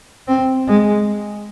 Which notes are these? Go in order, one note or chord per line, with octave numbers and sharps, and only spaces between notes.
C4
G#3